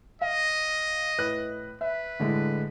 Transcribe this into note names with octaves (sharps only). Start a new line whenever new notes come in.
D#5 F5
A2 B4 F#6
B4 E5
A2 D3 G#3